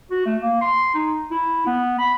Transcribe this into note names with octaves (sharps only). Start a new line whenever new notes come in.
F#4
A3
A#3
C6
D#4
E4
B3
B5